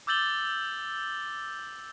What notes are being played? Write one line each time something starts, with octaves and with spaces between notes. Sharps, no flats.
D6 E6 G6 A6 F#7 G7